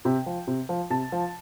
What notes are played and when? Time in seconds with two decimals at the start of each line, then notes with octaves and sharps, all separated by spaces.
0.05 C3 G5
0.26 F3
0.47 C3
0.69 F3
0.90 C3 A5
1.12 F3